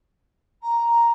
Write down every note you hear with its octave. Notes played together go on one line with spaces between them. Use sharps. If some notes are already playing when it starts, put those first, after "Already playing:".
A#5